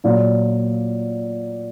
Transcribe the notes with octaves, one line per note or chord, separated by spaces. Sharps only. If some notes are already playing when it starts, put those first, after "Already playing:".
A#2 F#3 A#3